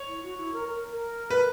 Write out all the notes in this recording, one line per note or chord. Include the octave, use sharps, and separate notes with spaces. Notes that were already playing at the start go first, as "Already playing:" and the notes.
Already playing: C#5
E4
F#4
E4
A#4
A#4
A#4
B4